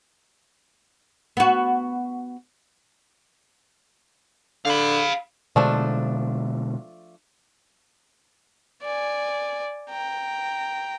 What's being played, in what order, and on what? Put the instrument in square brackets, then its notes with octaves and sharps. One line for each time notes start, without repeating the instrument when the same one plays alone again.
[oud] B3 F#4
[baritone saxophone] D3 [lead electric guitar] F5 B5
[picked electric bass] B2 D3 G#3 [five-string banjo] F3 A3 D4
[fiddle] D5 G#5
G5 A#5